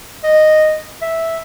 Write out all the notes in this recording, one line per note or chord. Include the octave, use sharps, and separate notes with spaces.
D#5
E5